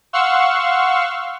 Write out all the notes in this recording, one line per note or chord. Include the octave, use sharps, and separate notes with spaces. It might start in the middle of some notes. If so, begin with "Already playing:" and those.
F5 F#5 C6 C#6 E6